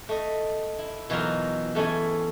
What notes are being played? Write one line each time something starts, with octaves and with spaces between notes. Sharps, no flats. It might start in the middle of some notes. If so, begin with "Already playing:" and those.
A3 D#5
E4
B2 E3 F#3 D#4 F4 A#4
E2 A3 C#4 E4 G#5